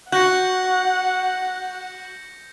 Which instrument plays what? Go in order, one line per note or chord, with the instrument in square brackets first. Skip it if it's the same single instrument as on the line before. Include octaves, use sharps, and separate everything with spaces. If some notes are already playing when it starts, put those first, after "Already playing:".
[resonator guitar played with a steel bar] F#4 [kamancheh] F#5 [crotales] G6 A#6 C#7